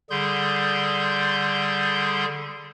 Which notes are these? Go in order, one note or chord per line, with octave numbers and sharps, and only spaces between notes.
D3 G3 G#4 C6 G6